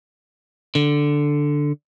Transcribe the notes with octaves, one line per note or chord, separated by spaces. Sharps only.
D3